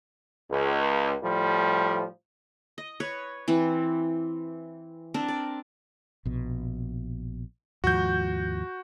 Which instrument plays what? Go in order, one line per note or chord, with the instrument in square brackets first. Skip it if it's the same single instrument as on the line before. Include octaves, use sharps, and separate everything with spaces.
[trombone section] C#2
A2 F3 G3
[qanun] D#5
B4 C#5
E3 C4
C4 D4 A#4
D5
[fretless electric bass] A#1 B2
[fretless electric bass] D#2 G#2 F3 [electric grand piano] F#4 G6